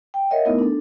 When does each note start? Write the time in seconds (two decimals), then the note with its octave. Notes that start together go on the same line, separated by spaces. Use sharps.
0.14 G5
0.30 A#4 C#5 D#5 E5 F#5
0.45 A3 B3 D#4 E4 A#4
0.59 D4 A4